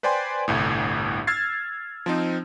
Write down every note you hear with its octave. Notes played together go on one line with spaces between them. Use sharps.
B4 C5 D5 G5 G#5 C6
G1 C2 A2
E6 F6 G#6 A6 C7
F3 C4 D#4